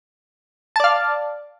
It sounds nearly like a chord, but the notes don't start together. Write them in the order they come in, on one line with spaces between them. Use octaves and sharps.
A5 D5 F5